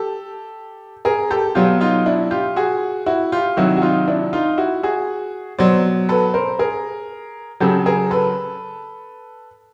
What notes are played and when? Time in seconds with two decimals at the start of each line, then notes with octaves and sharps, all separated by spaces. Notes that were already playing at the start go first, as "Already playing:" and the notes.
Already playing: G4 A4
1.05 G#4 A#4
1.30 G4 A4
1.55 B2 F#3 F4 G4
1.81 D#4 F4
2.06 D4 E4
2.31 F4 G4
2.56 F#4 G#4
3.06 E4 F#4
3.32 F4 G4
3.57 C3 D#3 F#3 E4 F#4
3.77 F#4
3.82 D#4 F4
4.07 D4 E4
4.33 D#4 F4
4.58 E4 F#4
4.83 F#4 G#4
5.58 B2 F#3 C5 D5
6.09 A4 B4
6.34 A#4 C5
6.59 G#4 A#4
7.60 C#3 F#3 G4 A4
7.86 G#4 A#4
8.11 A4 B4